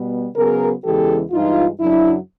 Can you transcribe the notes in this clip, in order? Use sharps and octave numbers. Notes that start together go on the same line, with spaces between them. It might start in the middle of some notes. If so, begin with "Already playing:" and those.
Already playing: B2 G3 B3
C#3 F#3 B3 G#4 A#4
E2 C#3 E3 G#3 G4 A4
G2 E3 G#3 D#4 F4
F#2 C#3 F#3 D4 E4